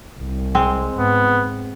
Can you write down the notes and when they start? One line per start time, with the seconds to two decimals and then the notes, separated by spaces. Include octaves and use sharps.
0.17 C2
0.55 G#3 C4
0.99 G#2 B3